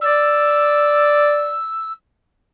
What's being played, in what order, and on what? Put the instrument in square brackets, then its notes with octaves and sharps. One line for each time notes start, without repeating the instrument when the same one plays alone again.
[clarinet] D5 [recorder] E6